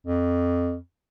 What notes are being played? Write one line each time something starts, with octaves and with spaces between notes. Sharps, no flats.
F2